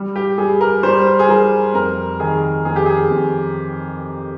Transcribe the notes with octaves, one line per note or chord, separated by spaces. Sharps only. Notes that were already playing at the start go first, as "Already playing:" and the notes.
Already playing: G3
G4
G3 G#4
A#4
G3 C5
G#4
G3 A#4
F2 A#4
D#3 G#4
F2 G#4
G4
G#4
F2